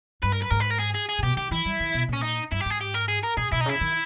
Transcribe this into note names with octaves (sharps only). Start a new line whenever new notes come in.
G2 B4
A#4
B4
G#2 A#4
B4
A#4
G#4
G#4
G#4
A#2
B2 G4
D#3 G4
E3 E4
G3
D#3
B2
A#2 C#4
D#4
G2 E4
G4
G#2 G#4
G4
A#4
G#4
A#4
A#2 G#4
B2 E4
D#4
C#3 E4
D#3